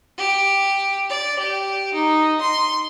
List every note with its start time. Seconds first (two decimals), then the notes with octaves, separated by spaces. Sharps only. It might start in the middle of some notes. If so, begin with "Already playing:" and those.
0.18 G4
1.10 D5
1.39 G4
1.94 D#4
2.40 C6